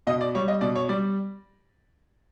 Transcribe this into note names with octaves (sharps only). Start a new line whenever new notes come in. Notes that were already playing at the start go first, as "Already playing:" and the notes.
B2 D#5
D5
G3 C#5
D#5
B2 D5
C#5
G3 D5